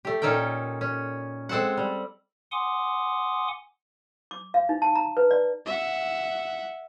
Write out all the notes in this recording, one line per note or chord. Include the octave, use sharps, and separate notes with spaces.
A3 G4
A#2 C#4 D#4 A4 A#4 G5
C#4
G#3 C4 A4 C5 F#5
G3
F#5 G#5 C6 D6 D#6
D6
F5
D#4
A5
A#5
B4
D5
E5 F#5